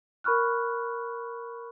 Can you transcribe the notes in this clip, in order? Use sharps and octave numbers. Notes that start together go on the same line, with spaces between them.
A#4 B5 C#6 F6 F#6